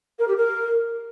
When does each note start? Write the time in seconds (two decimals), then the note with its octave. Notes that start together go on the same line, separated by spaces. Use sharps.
0.18 A#4
0.27 G4
0.36 A#4